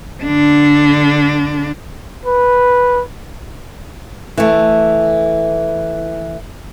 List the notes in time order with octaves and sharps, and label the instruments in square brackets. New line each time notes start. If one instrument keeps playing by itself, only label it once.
[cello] D3 D4
[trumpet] B4
[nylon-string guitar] E3 A3